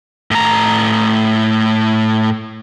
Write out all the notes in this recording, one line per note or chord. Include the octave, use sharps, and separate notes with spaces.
A2 A#5